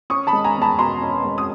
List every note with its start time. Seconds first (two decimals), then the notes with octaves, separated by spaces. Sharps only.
0.10 C#4 C#6 D#6
0.27 A5 B5
0.33 G#3
0.44 G#5 A#5
0.56 E2
0.62 A5 B5
0.79 B2 A#5 C6
1.02 C#4
1.24 G#3
1.38 D#6